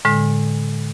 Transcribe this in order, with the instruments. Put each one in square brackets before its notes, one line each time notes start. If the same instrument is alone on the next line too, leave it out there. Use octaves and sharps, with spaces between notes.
[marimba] A2 D3 G#3